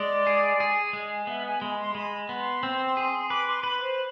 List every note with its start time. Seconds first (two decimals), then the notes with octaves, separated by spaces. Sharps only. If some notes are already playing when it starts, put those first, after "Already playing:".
Already playing: G#3 D5
0.27 G#4
0.60 G#4
0.93 G#3
1.27 B3 E5
1.45 G#5
1.61 G#3 B5
1.79 C6
1.95 G#3 B5
2.29 B3
2.40 C6
2.63 C4
2.97 G#4
3.30 B4 D6
3.47 C6
3.63 B4 B5
3.80 C5